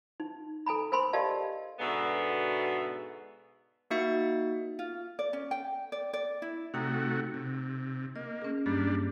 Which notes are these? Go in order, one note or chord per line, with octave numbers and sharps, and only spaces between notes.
D#4
A4 G#5 A#5 B5
A#4 C5 G#5 B5 C6
G4 A#4 D5 D#5 F5 A5
G#2 B2 D3 B3 F#4 E5
A#3 D#4 F#4 E5 A6 C#7
F4
D5
C#4
G5
D5
D5
E4
C3 A3 D#4 F#4 G5 A#5
C3
A#3 D#5
C#4 G#4
G2 G3 A#3 D4